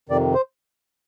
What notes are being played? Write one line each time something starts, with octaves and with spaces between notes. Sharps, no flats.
F2 C3 D#3 D5
C5